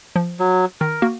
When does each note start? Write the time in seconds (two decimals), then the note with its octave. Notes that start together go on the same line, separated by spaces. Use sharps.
0.16 F3
0.39 F#3
0.81 D#3 A#4
1.02 A#3 F#4